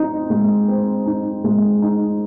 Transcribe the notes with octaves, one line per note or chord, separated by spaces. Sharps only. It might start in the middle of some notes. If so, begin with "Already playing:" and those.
Already playing: C4 D#4
G#3
C4
D#4
G#3
D#4